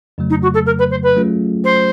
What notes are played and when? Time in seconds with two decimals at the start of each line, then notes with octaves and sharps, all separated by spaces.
0.18 F2 C#3 F#3 A3
0.30 D#4
0.42 F#4
0.54 A4
0.66 A#4
0.78 B4
0.90 C5
1.03 B4
1.15 F#3 A3 C#4 F4 G#4
1.64 C5